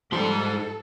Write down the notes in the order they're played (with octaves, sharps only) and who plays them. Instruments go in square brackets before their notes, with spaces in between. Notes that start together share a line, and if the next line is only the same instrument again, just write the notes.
[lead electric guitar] G#2 C6 [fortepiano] F3 G3 [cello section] A4